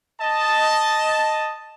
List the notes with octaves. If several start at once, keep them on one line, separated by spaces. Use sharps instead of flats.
D#5 A5